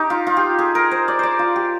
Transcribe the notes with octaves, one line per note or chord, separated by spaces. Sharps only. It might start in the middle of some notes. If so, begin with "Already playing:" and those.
Already playing: D#4 G4
F4
F4
G4
G#4
A#4
C5
D5
C5 D5
F4
G4